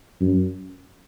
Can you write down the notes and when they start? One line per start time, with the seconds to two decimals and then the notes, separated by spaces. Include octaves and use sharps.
0.21 F#2